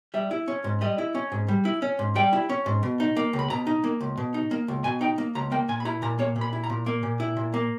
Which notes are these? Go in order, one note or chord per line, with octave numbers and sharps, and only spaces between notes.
G3 E5
E4
C#4
G#2
G3 D#5
E4
C#4
G#2
G3
E4
C#4
G#2
G3 G5
E4
C#4
G#2
B2
D#4
A#3
C#2
B5
B2 A#5
D#4
A#3
C#2
B2
D#4
A#3
C#2
B2 G#5
D#4 G5
A#3
C#2 A#5
A#3 G5
A#2 G#5
B5
E4 A#5
A#2 A#5
A#3 C#5
A#2
B5
E4
A#5
A#2
A#3
A#2
E4
A#2
A#3